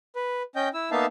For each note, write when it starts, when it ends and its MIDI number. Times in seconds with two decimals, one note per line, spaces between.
0.16 0.42 71
0.56 0.69 61
0.56 0.69 75
0.56 0.69 79
0.56 0.69 91
0.74 0.90 64
0.74 0.90 88
0.91 1.06 58
0.91 1.06 59
0.91 1.06 63
0.91 1.06 76
0.91 1.06 77
0.91 1.06 81